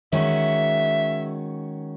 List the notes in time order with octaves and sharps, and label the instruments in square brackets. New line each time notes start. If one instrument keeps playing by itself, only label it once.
[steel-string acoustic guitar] D#3 G#3 C#4 F#4 [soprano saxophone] E5